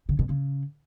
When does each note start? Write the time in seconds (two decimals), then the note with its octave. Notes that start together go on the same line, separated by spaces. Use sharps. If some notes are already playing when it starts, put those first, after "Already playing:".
0.09 C#3
0.19 B2
0.29 C#3